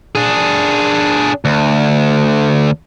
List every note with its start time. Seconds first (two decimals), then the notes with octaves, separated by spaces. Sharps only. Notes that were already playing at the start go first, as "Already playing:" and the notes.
0.15 D4 G#4
1.45 D2